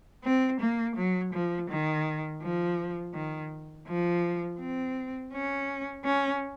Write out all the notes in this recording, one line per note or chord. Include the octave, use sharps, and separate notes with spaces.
C4
A#3
F#3
F3
D#3
F3
D#3
F3
C4
C#4
C#4